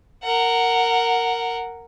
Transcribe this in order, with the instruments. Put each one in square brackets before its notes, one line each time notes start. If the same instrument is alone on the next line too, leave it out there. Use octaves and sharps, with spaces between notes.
[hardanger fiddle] A#4 F#5